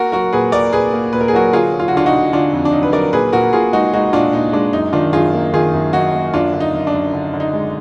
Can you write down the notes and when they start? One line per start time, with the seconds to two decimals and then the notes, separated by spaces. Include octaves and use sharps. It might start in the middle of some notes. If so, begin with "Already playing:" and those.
Already playing: A#3 F#4 A#4
0.12 F#3 F#4 A#4
0.33 A#2 G#4 B4
0.52 A#2 A#4 D5
0.72 A#2 G#4 B4
0.93 A#3
1.13 A#2 B4
1.21 A#4
1.28 G#4
1.33 F#3 F#4 A#4
1.52 D3 F4 G#4
1.73 F#3
1.79 F4
1.88 F#4
1.93 D3 D4 F4
2.06 D#4 F#4
2.13 D3
2.33 D3 D4 F4
2.53 F2
2.65 D4
2.73 F#3 D#4
2.83 B4
2.93 F#3 A#4 D5
3.13 A#2 G#4 B4
3.33 A#2 F#4 A#4
3.53 A#2 F4 G#4
3.73 G#3 D#4 F#4
3.93 G#3 D#4 F#4
4.13 A#2 D4 F4
4.33 A#2 D#4
4.53 G#3 D4
4.73 F#2 D#4
4.93 D#3 D4 F4
5.13 F#2 F4 G#4
5.34 A#3
5.53 D#3 F4 G#4
5.74 F#2
5.93 F#2 D#4 F#4
6.13 A#3
6.33 F#2 D4 F4
6.53 D3
6.60 D#4
6.74 F#2
6.87 D4
6.94 F#2
7.13 D3
7.34 D3
7.40 D#4
7.53 G#3